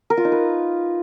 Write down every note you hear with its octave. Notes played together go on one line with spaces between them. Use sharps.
A#4
F4
D#4
B4